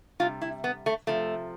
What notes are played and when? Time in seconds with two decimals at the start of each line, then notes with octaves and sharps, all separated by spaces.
0.20 C3 G3 F4
0.42 E4
0.64 B3
0.86 A3
1.07 C3 F3 A3